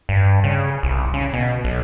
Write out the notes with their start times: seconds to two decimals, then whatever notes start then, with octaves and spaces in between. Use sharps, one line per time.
0.09 G2
0.44 C#3
0.83 C2
1.14 C#3
1.33 B2
1.64 B1